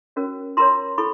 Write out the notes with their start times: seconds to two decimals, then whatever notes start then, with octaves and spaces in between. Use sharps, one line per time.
0.16 C#4 F#4 A#4 C#5
0.57 F4 A#4 C#5 A#5 C6
0.98 E4 A4 B5 C#6